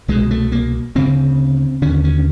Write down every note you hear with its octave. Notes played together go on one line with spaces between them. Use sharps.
C2 B2 G#3
A3
A#3
D2 C#3 C4
D#2 D3 C#4
C#4